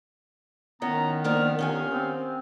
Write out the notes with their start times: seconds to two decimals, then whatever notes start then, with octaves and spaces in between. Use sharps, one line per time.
0.82 A2 D#3 B3 C#4 A#5
1.24 F3 A#3 D4 F6
1.59 C#4 G4 F5 G#5
1.89 C4